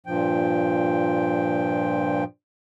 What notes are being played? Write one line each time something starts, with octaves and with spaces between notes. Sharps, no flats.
G2 A#2 F3 G5